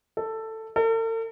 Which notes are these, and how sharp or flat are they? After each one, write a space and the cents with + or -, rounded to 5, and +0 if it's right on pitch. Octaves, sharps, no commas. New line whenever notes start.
A4 +10
A4 +45